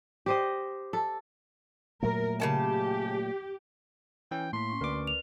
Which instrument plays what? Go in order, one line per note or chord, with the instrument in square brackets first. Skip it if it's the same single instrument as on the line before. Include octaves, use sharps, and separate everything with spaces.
[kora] G4 C5 D#5
A4
[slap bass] A#2 F#3 A3 [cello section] A#4
[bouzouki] C#3 C#4 A5 [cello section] G4
[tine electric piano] E3 C#4 [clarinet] G5
[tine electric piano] A2 [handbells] A#3 B6 [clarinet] C6
[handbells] C#4 C#6
[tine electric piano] D2 D6 [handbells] A#4 B4 D5
[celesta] F7